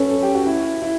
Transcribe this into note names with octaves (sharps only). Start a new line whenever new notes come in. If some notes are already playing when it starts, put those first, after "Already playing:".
Already playing: F#2 C#4 A4 B4
A4
G4
F#4
E4
E4